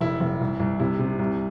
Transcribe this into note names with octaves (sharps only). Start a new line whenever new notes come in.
F1 E4
F1
C2
C2
C3 E4
C3
C2